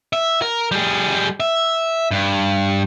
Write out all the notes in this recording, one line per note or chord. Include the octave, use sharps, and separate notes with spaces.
E5
A#4
G3 G#4
E5
G2